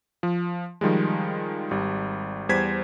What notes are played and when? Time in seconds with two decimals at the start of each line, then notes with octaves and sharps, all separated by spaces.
0.23 F3
0.81 D#3 F3 G3 G#3
1.71 G#1 G3
2.49 E2 G3 C5 G#6 B6